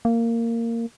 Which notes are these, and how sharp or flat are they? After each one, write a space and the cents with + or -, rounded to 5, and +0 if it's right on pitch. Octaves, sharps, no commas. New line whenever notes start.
A#3 -15